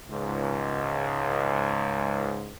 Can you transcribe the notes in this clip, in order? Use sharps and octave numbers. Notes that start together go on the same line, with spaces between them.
C#2 G#2